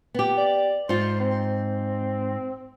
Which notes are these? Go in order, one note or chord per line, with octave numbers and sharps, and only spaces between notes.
B3 G4
D5
G#2 F4 C5
C4